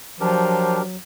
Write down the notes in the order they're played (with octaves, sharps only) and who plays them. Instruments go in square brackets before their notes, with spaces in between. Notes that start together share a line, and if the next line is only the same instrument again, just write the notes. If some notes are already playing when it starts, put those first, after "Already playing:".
[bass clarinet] F3 [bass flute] F#3 [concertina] D4 G4 A#4